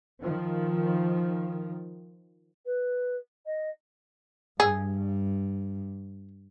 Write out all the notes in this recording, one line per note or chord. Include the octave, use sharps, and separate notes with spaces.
D#3 F3
B4
D#5
G2 G#4